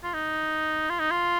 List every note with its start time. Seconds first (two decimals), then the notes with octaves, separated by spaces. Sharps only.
0.04 F4
0.14 D#4
0.90 F4
0.99 D#4
1.11 F4